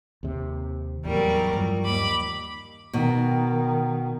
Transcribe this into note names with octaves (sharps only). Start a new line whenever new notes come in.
D#2 C3
E2 A2 F#3 G3 A#4
G2 F3
D#2 B5 D6
B2 D#3